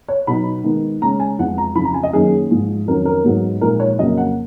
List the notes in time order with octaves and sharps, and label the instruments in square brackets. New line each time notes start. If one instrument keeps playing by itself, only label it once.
[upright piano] C#5
B2 F#3 B3 D#4 B5
D#3 G#3 B3 D#4
C#3 G#3 C#4 A#5
G#5
F2 F3 G#3 B3 F#5
A#5
F2 C#3 F3 B5
A#5
G#5
D#5
F#2 D#3 A#3 C#4 G#4
G#2 F3 G#3
F2 D#3 F#3 C#4 A#4
A#4
G#2 F#3 B3 D#4
A#2 F3 G#3 D#4 A#4
C#5
F2 C#3 F#3 A#3 D#5
F#5